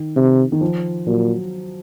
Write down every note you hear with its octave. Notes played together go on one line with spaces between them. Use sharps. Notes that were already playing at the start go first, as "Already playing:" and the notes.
Already playing: D#3
C3
D#3
F3
A#2 F#3